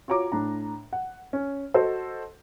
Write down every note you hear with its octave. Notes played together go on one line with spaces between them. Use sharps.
F4 F#4 C#5 A#5 D6
A2 D4 A#5
F#5
C#4
F#4 A4 C5 D#5